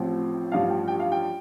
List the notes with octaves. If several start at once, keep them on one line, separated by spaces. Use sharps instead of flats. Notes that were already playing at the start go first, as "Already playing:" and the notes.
Already playing: A1 A2 F3 C4
A1 G2 F3 F5
G5
G5
F5
G5